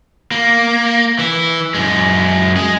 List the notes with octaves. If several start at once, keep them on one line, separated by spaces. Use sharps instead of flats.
A#3
E3 E4
F#2 G#3
G#3 G#4